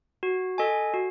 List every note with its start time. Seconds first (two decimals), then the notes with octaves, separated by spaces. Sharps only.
0.23 F#4
0.58 A4 D#5 G#5
0.94 F#4